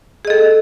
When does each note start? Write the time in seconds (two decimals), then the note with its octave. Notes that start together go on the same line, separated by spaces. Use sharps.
0.25 G#4
0.27 D#5
0.30 A4